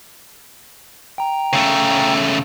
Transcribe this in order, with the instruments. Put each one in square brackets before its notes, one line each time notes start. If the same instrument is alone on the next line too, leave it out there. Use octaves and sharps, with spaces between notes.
[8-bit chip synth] G5 A#5
[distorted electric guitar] C#3 A3